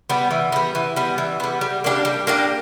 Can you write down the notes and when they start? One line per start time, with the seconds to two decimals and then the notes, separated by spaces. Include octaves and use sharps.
0.10 G3 B3
0.31 E3
0.52 G3 B3
0.75 E3
0.96 G3 B3
1.18 E3
1.40 G3 B3
1.61 G3
1.84 A#3 D4 G4
2.05 G3
2.27 A#3 D4 G4